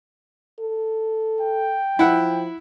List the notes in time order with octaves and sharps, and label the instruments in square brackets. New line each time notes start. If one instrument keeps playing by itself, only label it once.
[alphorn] A4
[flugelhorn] G5
[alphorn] F3 [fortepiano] E4 F#5